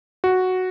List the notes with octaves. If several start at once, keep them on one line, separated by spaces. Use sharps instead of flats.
F#4